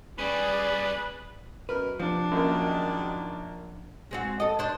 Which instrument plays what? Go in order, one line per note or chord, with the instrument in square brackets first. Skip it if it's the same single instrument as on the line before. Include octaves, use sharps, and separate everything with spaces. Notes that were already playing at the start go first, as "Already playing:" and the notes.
[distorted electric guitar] G3 C#4 [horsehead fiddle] G#4 [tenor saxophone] B4 [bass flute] D5
[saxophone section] F#2 B2 A#4 [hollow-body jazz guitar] B4
[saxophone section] C3 A#3 [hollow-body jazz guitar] F3 [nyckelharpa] D4
[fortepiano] F#2 A#3 [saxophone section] D#3 F#3 G#3
[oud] G#3 C4 F#4
A4 D#5
D4 C5